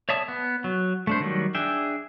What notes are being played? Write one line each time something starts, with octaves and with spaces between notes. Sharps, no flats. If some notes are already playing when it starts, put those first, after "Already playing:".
C#5 D5 E5 A5 D#6
B3
F#3
A3 D4 C5
D#3 F#3 G3
D4 G#4 E5 G5